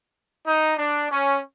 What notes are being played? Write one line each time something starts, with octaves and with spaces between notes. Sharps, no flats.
D#4
D4
C#4